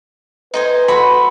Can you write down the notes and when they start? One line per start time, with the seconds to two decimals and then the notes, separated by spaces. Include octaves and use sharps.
0.54 D#4 B4 C5 G#5
0.88 F#4 A4 C5 B5